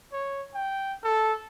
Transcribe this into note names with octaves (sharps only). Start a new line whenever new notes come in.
C#5
G5
A4